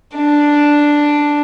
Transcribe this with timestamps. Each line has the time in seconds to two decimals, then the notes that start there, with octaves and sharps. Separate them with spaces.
0.16 D4